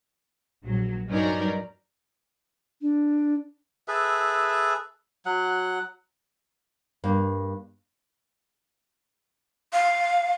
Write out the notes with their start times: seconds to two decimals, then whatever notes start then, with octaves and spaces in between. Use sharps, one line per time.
0.66 A#1 F#3
1.08 G2 F#3 C#4 D#4 A#4 D5
2.82 D4
3.88 G#4 A4 B4 E5
5.26 F#3 F#5
7.04 G2 A#3
9.73 F5